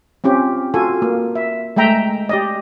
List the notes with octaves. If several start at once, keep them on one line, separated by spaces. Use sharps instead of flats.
C4 C#4 F4 G4
F4 F#4 A4 G#5
A#3
E5
G#3 A3 E5 G5 A#5
G4 D5 D#5